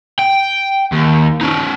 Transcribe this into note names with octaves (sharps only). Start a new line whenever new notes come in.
G5
D#2
C#4 D#4